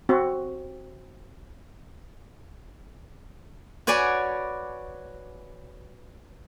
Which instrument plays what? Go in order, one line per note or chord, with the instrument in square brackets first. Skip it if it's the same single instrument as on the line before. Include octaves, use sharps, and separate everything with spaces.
[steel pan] C4 F#4
[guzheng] F#4 B4 C#5 D5 G#5